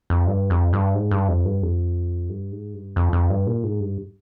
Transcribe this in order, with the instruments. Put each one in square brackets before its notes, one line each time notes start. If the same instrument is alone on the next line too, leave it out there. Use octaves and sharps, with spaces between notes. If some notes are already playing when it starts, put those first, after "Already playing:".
[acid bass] F2
G2
F2
G2
G#2
G2
F2
G2
F2
G2
G#2
G2
F2
F2
G2
A#2
G#2
G2